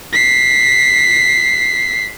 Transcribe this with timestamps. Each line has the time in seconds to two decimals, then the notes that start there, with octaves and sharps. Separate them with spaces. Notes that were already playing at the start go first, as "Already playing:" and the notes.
0.13 B6 C7